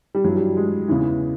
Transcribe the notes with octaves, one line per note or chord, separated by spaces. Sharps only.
G3
G2 E3 F#3
G3
G#3
E2 C#3 E3